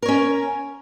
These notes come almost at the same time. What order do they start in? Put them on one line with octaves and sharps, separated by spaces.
A#4 C#5 C#4